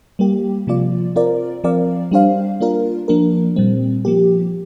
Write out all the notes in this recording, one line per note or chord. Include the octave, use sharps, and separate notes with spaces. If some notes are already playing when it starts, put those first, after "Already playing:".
G3 A#3 G4
C3 F3 A#3 F4 D5
C4 F4 A#4 D5
F3 C4 A#4 D5 F5
G3 D4 G4 C5 F5
A#3 D4 F4 A#4
F3 A#3 D4 A#4
A#2 G3 C4
F3 A#3 G4